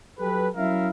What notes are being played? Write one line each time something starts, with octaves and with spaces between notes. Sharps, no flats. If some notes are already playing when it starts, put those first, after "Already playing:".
F#3 G4 A4 B4
F#3 C#4 E4 A#4 E5 F5